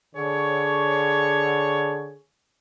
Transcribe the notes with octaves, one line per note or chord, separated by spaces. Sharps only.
D3 G#4 C#5